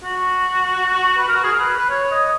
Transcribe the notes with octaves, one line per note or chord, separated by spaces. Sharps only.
F#4
B4
A#4
F#4
G#4
A#4
B4
B4
C#5
D#5